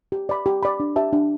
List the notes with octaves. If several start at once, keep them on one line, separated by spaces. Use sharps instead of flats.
G4
D5 B5
G4
D5 B5
D4
G4 E5 A5
D4